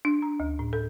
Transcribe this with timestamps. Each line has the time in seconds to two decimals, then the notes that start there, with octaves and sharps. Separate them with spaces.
0.05 D4
0.22 A#5
0.40 D2
0.59 A2
0.73 A4